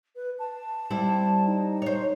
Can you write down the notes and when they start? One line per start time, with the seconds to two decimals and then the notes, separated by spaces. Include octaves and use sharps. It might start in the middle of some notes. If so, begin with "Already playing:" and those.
0.15 B4
0.39 A5
0.90 G3 C4 E4
1.46 D#4
1.82 C5 C#5